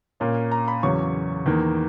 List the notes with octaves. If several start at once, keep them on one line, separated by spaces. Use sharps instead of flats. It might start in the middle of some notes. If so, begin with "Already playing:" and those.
A#2 A#3 C#4
A#5
B5
E2 C#3 F#3 C#4 C#6
E2 D#3 A#3